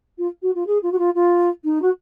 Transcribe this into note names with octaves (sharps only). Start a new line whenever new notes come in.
F4
F#4
F4
G#4
F4
F#4
F4
F4
D#4
F#4